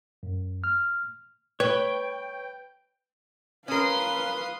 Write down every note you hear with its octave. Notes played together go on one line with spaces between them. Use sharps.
F#2
F6
B4 C#5 G5
C#4 A#4 B4 F5 C6 D#6